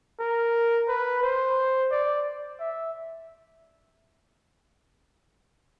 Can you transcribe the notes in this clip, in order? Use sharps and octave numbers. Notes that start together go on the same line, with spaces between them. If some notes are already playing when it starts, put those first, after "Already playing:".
A#4
B4
C5
D5
E5